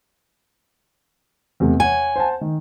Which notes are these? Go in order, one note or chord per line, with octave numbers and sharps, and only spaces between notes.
E2 C3 A3
C#5 F#5 G#5
C5 F#5 A5
D#3